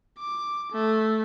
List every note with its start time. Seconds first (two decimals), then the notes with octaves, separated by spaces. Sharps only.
0.18 D6
0.72 A3